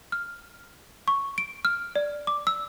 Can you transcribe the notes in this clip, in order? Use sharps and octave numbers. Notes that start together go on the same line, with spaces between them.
F6
C#6
D7
F6
D5
D6
E6